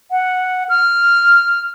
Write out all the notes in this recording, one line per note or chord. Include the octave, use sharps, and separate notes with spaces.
F#5
F6